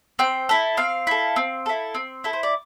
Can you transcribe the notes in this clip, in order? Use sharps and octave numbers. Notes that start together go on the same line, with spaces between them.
C4 G5
E4 A4
C4 F5
E4 A4
C4
E4 A4
C4
E4 A4
C5
D5